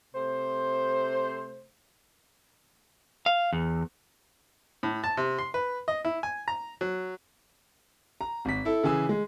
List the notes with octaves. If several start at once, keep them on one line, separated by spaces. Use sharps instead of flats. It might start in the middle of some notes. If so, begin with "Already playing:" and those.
C3 A3 C5
F5
E2
A2
A5
C3
C6
B4
D#5
E4
G#5
A#5
F#3
A#5
G#1 B6
E4 A4
C#3 E3 G#4 E6
G#3